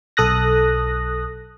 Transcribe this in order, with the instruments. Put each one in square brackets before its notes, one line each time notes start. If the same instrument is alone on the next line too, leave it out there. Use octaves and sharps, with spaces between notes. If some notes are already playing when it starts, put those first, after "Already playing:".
[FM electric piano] B1 A4 D#6 F#6 A#6